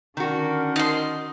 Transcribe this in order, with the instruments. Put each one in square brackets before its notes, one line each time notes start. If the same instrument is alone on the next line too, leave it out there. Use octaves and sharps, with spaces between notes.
[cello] D3 C#4 [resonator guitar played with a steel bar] D#3 F#4 [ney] A#4
[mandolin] D#4 C6